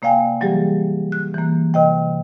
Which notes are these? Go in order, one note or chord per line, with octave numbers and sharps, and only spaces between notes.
C3 A#3 D5 F5 G5 G#5
E3 F#3 G3 A#3 G4 G#4
F#6
E3 A#3
C3 D#5 G5